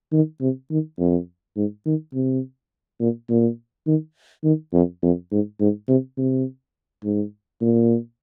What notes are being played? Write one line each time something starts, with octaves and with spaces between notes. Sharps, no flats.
D#3
C3
D#3
F2
G#2
D#3
C3
A#2
A#2
D#3
D#3
F2
F2
G#2
G#2
C3
C3
G#2
A#2